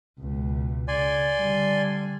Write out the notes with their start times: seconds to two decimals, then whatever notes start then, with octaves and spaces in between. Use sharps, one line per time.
0.20 C#2 B2
0.88 C#3 D5 G#5 C6
1.40 D3 G3